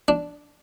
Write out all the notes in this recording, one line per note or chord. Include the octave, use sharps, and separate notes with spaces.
D4